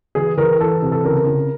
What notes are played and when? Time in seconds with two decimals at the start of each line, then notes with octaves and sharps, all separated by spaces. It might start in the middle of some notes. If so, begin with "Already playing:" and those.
0.15 E3 G#4
0.37 E3 A#4
0.60 E3 A4
0.82 C3
0.92 A4
1.04 C#3 A#4
1.27 C#3